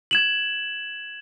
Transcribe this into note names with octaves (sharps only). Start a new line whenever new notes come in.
G#6 E7 F#7